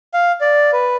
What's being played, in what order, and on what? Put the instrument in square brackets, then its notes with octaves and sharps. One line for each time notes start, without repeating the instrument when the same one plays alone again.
[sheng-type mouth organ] F5
D5
B4